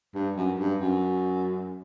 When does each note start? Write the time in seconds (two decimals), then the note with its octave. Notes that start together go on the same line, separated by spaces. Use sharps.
0.15 G2
0.37 F#2
0.59 G2
0.80 F#2